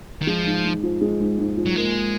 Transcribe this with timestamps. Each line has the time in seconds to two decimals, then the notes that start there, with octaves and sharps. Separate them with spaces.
0.22 D#3
0.27 F3 G#3
0.46 G#2
0.64 G#2
0.83 F3
1.01 G#3
1.20 G#2
1.39 G#2
1.57 F3
1.66 F#3
1.76 G#3 A#3